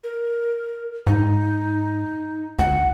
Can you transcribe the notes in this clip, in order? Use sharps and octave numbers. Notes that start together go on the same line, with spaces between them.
A#4
G#2 D#4
D2 F#5